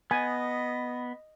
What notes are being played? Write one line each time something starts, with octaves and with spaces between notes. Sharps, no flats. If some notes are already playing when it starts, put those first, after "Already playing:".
B3 D#5 G#5